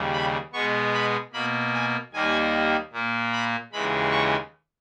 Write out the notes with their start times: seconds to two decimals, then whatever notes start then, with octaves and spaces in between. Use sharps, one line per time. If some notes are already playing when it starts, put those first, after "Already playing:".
Already playing: D#2 C#3 G3
0.13 B5
0.53 B2 G#3 B3 C#6
0.93 B5
1.33 B2 A#3 B5
1.73 G#5
2.13 D#2 D#3 G3 A#3 G#5
2.93 A#2 A#3
3.32 B5
3.72 D#2 C#3 E3 G#3 B5
4.11 C#6